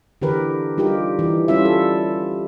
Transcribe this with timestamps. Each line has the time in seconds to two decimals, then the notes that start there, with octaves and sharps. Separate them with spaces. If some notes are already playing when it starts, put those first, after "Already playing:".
0.22 D3 E3 G4 A#4 B4
0.78 G3 D#4 F4 G4 A#4
1.19 E3
1.48 G3 C#4 E4 F4 E5
1.65 A4